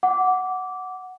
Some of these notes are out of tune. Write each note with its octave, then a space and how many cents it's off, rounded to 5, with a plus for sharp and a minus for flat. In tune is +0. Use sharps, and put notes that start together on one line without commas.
F#5 +0 D6 -15